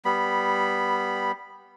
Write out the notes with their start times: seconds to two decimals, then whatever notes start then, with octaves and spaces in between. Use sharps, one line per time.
0.05 G3 B3 B5